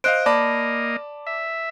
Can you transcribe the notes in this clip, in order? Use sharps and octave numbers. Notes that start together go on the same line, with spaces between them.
C5 D#5 F5 F#6 D7
A#3 D5 D#5 A5 B5 D6
E5